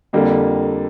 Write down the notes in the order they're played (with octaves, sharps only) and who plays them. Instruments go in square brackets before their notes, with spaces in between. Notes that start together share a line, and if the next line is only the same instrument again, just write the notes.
[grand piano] F2 D3 G3 A#3